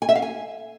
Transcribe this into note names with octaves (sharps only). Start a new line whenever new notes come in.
G#5
E5
F5
G#5